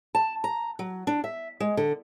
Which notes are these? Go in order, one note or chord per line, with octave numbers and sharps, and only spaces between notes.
A5
A#5
F#3
D4
E5
G#3
D3